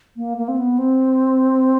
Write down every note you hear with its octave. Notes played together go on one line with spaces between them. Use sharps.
A#3
A#3
C4
B3
C4